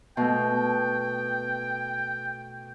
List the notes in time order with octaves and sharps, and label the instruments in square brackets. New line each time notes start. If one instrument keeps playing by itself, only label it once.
[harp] B2 A3 [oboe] G5